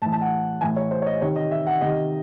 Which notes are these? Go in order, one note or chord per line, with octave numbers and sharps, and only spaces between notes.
A2 E3 A5
A5
F#5
A2 E3 G#5
C#5
C5
C#5
D#5
C3 D#3 C#5
D#5
E5
F#5
C3 D#3 D#5